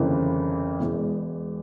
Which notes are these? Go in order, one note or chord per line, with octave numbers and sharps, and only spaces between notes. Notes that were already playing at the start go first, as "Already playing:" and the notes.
Already playing: G1 F2 C#3 E3 A#3
E1 E2 E3 G#3